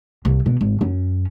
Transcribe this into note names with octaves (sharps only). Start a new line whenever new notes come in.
C2
B2
G#1
F#2 C#4